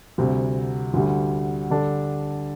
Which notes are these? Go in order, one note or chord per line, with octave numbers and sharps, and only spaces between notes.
D2 C3 G3
D2 D3 G3
D3 G3 D4 A4